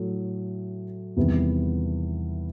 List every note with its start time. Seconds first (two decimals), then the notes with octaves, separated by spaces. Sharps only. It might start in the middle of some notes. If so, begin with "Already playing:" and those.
Already playing: A2 F#3 A3
1.16 E2 C3 D#3 G3 B3